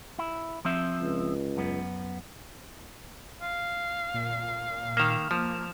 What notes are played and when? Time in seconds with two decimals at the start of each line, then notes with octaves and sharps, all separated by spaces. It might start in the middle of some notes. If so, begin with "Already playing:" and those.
0.19 E4
0.65 F3 C4 E5
1.00 C#2
1.57 F#2 B3
3.42 F5
4.14 A#2
4.97 D#3 A#3 F6 E7 F7
5.31 F3 A#3